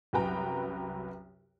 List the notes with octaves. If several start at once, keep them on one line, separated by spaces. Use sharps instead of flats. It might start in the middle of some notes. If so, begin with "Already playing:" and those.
C2 F#2 F#4 B4 G5 A#5